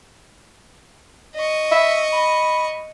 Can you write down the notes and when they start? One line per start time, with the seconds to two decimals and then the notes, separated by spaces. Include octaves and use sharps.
1.35 D#5 C#6
1.72 E5
2.13 B5